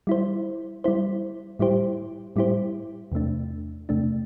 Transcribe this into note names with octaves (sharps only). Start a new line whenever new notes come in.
G3 E4 C5
G3 E4 C5
A2 G3 E4 G4 C5
A2 G3 E4 G4 C5
E2 C3 A3 D4
E2 C3 A3 D4